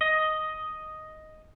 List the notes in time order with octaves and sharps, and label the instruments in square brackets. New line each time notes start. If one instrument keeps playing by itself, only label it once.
[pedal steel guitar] D#5